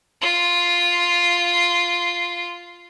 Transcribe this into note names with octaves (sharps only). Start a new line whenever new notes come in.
F4 C6